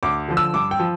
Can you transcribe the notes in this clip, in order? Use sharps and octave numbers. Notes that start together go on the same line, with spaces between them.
D2 D6
D3 F3
E6
G2 D6
G5
F3